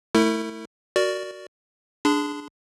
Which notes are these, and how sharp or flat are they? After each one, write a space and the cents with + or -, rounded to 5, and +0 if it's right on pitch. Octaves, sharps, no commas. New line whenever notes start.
A3 +0 E4 -15 A#4 -45
F#4 +5 A#4 +0 D5 +0
D4 +0 G#4 +0 C6 -40